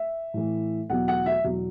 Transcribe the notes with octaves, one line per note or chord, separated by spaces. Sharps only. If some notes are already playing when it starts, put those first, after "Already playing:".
Already playing: E5
A2 E3
E2 B2 F#3 F#5
F#5
E5
E2 B2 F#3